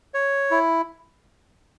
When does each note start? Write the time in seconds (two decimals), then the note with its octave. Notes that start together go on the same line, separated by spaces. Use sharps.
0.14 C#5
0.51 E4